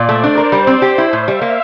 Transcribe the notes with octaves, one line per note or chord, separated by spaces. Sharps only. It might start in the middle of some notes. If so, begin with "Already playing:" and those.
Already playing: A#2 D5
A3 C5
D4
A#4
G3
C4
G4
E4 E5
A2
G3 F5
A#3